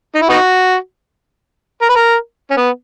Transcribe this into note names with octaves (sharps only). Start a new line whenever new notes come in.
D#4
E4
B3 D#4 F#4
A#4
B4
A#4
C#4
B3